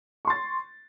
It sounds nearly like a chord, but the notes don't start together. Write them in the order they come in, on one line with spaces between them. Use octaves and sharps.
C#6 C6 A6